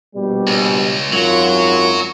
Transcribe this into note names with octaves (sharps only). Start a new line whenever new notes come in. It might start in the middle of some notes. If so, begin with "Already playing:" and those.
A#1 B2 G3
C#2
G#1 F#2 F#3 F4